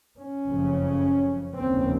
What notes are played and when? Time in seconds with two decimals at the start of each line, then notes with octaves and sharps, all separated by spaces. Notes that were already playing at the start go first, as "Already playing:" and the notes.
0.18 C#4
0.46 F#1 F2 C#3
1.58 F1 D#2 C#3 C4